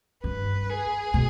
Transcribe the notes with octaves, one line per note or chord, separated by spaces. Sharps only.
G2 B4
G#4
B2